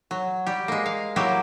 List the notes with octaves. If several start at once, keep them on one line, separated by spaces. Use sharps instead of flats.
F#3
G3 G4
G#3 A#3
F5
F#3 A#3 E4 G4